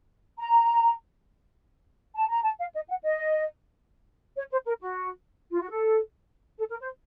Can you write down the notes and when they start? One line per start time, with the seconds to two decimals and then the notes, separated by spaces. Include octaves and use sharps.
0.38 A#5
2.16 A5
2.29 A#5
2.43 A5
2.60 F5
2.74 D#5
2.89 F#5
3.04 D#5
4.37 C#5
4.52 C5
4.66 A#4
4.82 F#4
5.52 F4
5.61 F#4
5.70 A4
6.58 A4
6.70 A#4
6.81 C5